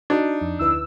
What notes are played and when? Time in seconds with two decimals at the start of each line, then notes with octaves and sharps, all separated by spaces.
0.10 D4 D#4 F#4
0.41 F2
0.59 D2 E4 B4 E6